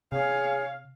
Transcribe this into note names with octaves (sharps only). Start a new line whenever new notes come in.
C3 G#4 C#5 F5